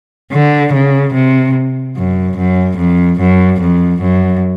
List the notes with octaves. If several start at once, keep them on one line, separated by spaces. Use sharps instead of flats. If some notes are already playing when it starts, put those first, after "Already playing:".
D3
C#3
C3
F#2
F#2
F2
F#2
F2
F#2